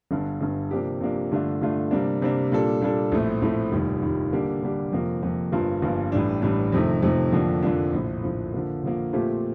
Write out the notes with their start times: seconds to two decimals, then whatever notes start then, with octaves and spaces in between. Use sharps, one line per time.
0.11 G1 G2 D3
0.41 G1 G2 D3
0.71 C3 F3 A#3 D4 G4
1.00 C3 F3 A#3 D4 G4
1.31 G2 D3 A3 D4 F4
1.61 G2 D3 A3 D4 F4
1.91 C3 G3 A#3 D4
2.22 C3 G3 A#3 D4
2.52 A#2 G3 D4 A4
2.82 A#2 G3 D4 A4
3.12 A#1 A2 A3 C4
3.42 A#1 A2 A3 C4
3.71 F1 D#2 D#3 G3
4.02 F1 D#2 D#3 G3
4.32 D3 G3 A#3 D4 G4
4.62 D3 G3 A#3 D4 G4
4.92 F2 C3 F3 A#3
5.22 F2 C3 F3 A#3
5.52 G1 G2 F3 A#3 F4
5.82 G1 G2 F3 A#3 F4
6.12 A1 A2 G3 D4
6.42 A1 A2 G3 D4
6.72 F2 C3 D#3 A3
7.03 F2 C3 D#3 A3
7.32 F2 D3 F3 A#3 D4
7.63 F2 D3 F3 A#3 D4
7.93 A#1 A2 F3
8.23 A#1 A2 F3
8.54 D3 F3 A#3
8.83 D3 F3 A#3
9.13 A#2 F3 A3 C4 G4